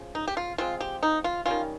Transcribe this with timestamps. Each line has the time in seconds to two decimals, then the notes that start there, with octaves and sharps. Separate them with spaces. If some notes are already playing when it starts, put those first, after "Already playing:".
Already playing: C#3 F3
0.15 D#4
0.28 G4
0.37 F4
0.58 F3 G#3 C4 F4
0.80 G4
1.03 D#4
1.24 F4
1.46 D#3 G3 C#4 F4